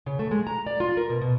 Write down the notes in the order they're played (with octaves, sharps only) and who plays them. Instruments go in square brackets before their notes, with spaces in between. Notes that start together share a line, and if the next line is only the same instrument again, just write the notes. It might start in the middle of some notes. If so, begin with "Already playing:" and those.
[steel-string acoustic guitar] C#3
A3
G#3
A#5
D5
F4
A#4
B2
B2